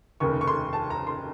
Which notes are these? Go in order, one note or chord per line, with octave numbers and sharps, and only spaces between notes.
F1 D#2 C#3 C#6
C#6
C6
A5
A#5
C6